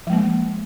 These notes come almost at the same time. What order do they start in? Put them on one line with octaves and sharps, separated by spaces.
F3 G#3 A#3